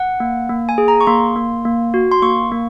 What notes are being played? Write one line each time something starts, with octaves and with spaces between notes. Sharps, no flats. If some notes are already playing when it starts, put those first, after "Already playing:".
Already playing: F#5
A#3
A#3
G#5
G#4
A#5
C#6
A#3 C6
A#3
A#3
F#4
C6
A#3 C#6
A#3